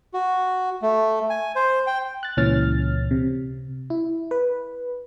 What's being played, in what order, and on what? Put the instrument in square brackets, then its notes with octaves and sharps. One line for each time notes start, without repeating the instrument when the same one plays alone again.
[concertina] F#4
A3
G#5
C5
G5
[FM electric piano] F#6 A6
C#2 A#2 E3 C#4 F6 A6
C3
E4
B4